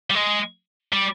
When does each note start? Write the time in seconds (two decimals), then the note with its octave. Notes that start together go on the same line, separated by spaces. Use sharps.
0.10 G3
0.15 G#3
0.93 G3